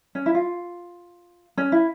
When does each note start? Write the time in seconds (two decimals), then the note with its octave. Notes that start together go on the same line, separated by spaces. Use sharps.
0.15 C#4
0.26 E4
0.35 F4
1.57 C#4
1.72 E4